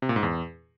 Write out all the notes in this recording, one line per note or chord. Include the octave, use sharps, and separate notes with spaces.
C3
A#2
G#2
E2